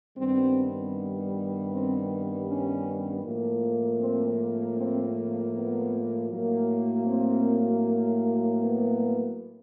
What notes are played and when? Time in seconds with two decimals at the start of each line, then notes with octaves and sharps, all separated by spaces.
0.17 G2 D#3 G3 B3 C4
1.70 C4
2.47 C#4
3.24 A2 F3 A#3
4.00 C4
4.76 C4
5.53 B3
6.30 A2 F#3 A#3
7.06 C4
8.60 B3